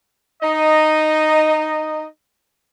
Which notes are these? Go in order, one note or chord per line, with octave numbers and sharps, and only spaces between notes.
D#4 D#5